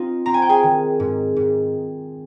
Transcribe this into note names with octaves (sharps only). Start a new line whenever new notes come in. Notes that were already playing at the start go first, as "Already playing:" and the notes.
Already playing: C4 D#4 F4 F5
C4 A#5
G#5
G5
G#4 G#5
D#3
G#2
G#2